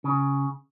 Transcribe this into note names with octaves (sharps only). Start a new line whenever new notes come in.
C#3